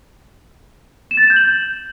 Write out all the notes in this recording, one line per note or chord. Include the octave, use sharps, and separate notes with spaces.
E7
A6
E7
G6
F#7